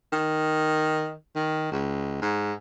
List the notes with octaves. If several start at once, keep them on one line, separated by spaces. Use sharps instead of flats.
D#3
D#3
C#2
G#2